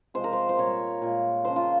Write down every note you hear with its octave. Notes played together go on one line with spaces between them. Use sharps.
C3 F3 G#3 C5
A#4
C5
C5
A#2 G3 C#5
A#2 G#3
C#3 F3 G#3 C5
F4